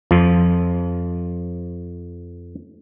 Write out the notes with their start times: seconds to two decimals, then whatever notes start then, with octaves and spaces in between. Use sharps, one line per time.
0.11 F2 F3